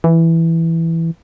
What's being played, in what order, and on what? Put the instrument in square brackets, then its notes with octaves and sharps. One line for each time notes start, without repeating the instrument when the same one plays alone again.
[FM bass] E3